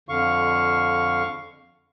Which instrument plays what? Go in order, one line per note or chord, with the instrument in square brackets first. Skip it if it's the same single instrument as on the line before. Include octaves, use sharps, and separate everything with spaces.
[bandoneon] F2 D3 F5 C#6